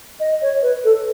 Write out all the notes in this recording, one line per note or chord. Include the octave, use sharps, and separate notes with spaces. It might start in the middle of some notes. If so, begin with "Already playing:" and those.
D#5
C#5
B4
A4